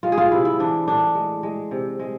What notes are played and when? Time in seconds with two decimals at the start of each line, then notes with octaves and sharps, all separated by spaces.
0.03 G#3 F4
0.12 G#4
0.18 F4
0.32 C3 E4
0.45 E4
0.60 E3 D4
0.88 A2 D4
1.15 G#3
1.43 G#3
1.71 C3
1.99 G#3